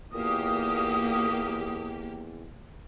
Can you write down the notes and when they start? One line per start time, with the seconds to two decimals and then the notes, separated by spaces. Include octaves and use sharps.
0.13 E2 A#2 A#3 G4 F5 D#6